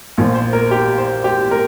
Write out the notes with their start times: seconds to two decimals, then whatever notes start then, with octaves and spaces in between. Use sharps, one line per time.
0.18 A#1 A#2 F3
0.35 C5
0.53 A#4
0.71 G4
0.98 C5
1.24 G4
1.51 A#4